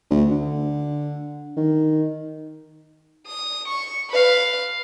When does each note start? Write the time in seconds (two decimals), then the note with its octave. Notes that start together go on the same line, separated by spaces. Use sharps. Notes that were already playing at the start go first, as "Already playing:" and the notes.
0.11 D2
0.31 D3
1.57 D#3
3.27 D#6
3.68 C#6
4.10 B4 F5